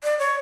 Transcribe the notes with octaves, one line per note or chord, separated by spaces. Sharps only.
D5
C#5